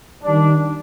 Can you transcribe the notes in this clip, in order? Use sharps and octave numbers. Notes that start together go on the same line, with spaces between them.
D#3 G3 D4